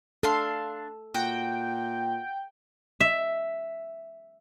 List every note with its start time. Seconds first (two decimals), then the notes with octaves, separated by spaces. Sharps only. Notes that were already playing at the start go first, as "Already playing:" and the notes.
0.23 D4 A4 F5 C6
1.14 A#2 F#4 G5
3.00 E5